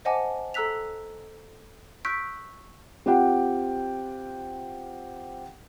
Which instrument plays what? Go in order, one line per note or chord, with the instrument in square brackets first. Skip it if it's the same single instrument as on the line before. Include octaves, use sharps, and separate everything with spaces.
[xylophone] C5 D#5 F#5 G#5 A5 D6
A4 A#5 E6 F#6 B6 F7
C#6 E6 F#6 G6 B6 D7
[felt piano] C4 F4 G4 F#5 G5